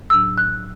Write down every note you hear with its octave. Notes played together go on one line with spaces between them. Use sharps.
A2 F#3 D4 E6
F#6